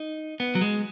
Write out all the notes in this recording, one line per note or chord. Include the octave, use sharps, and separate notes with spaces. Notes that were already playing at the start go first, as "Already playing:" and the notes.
Already playing: D#4
B3
F#3
G#3